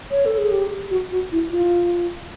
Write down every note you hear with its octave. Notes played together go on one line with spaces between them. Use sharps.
C#5
A4
G#4
G4
F#4
F#4
E4
F4